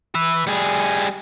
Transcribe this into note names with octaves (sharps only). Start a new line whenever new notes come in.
B4 E5
G3 G#4